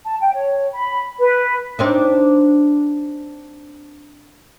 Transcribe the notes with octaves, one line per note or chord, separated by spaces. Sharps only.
A5
G5
C#5
B5
B4
C4 D4 D#4